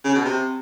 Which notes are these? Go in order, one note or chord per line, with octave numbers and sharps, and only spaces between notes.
C#3
B2
C3